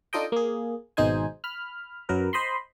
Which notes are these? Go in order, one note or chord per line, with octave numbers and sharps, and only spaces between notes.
D4 D#4 F4 A4 D#5 G5
A#3 G#4
G#1 B2 G#3 D#4 C5 G#5
B5 F6
F#2 F#3 A#4 B4
C5 D#5 B5 C6